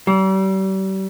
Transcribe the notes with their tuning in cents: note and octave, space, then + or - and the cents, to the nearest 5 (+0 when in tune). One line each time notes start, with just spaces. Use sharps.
G3 -40